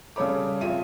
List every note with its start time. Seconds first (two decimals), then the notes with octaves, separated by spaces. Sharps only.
0.16 C#3 G3 A4 C#5 B5 D6
0.61 F2 C#3 F4 E5 D#7